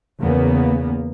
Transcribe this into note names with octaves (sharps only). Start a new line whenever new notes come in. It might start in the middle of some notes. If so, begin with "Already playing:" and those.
E2 C#3 A#3 B3